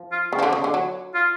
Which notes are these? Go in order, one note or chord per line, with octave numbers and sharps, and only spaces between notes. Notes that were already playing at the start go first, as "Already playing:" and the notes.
Already playing: F3
F4
C#3
F3
D3
C#3
D3
F#3
F4